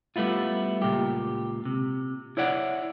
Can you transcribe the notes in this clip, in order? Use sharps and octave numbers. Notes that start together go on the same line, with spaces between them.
G3 A3 B3 E4 F4
C#2 A#2 G4
C3
E4 C#5 D5 F#5